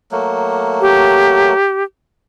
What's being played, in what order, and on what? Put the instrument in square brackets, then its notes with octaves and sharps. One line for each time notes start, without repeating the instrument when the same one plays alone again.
[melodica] F#3 A3 A#3
[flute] G4